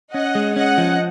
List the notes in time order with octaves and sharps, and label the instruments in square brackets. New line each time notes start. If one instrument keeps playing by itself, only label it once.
[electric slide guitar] C#4 [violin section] D#5 F#5
[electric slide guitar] G#3
[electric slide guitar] C#4 [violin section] D#5 F#5
[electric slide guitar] F3